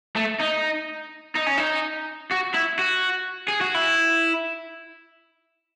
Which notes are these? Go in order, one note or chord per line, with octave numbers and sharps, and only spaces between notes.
A3
D#4
D#4
C#4
D#4
F#4
E4
F#4
G#4
F#4
E4